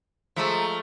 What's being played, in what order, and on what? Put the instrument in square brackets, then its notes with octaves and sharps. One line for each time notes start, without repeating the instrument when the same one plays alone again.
[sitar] F3 G#3 A3 [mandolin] E5 A#5 E6